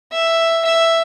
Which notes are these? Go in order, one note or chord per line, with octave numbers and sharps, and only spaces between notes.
E5
E5